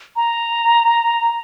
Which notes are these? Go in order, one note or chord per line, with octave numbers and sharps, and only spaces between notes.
A#5